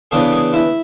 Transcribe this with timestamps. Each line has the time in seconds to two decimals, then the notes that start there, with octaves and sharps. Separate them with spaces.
0.11 C#3 E3 B3 D4 G#4
0.32 G#4
0.53 E4